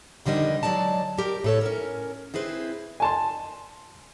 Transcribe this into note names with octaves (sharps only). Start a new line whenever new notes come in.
F2 D3 D#3 G3 D#5
F#3 G#3 D5 A5
G3 G4 A#4
A2 A4 C#5
C#4 A#4
C4 E4 G#4 B4 C5
G#5 A5 C6